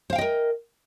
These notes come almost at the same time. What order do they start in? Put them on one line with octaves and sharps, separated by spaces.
C5 F5 G5 D#5 A#4